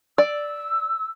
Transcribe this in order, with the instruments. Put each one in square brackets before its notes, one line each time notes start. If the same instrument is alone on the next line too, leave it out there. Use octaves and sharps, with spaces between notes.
[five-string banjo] D5 [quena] E6